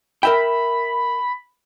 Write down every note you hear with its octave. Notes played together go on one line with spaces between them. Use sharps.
A#4 E5 G5 B5